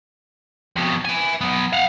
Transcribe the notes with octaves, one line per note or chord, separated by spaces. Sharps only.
F2 B2
E5 G#5
F#3 B3
F5 F#5